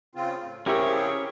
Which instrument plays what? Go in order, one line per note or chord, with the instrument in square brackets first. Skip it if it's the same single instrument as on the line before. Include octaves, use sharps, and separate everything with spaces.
[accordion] C#3 C4 F4
A2
[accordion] C#3 C4 G#4 [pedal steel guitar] C#4 C#5 [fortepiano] E4 G4 A#4